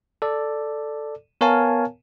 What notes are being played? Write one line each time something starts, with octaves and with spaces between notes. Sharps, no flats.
A4 D5
B3 A#4 C#5 F5 G#5 A5